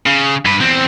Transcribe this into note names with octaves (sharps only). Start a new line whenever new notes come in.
C#3
G2 B4
E2 C4